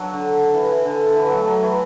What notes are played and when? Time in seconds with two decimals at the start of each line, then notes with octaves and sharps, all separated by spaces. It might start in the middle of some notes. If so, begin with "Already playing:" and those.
Already playing: F#3 D4 F#4
0.14 D3
0.54 E3
0.70 E3
0.85 D3
1.06 D3
1.16 E3
1.27 F#3
1.37 A3
1.47 F#3
1.63 E3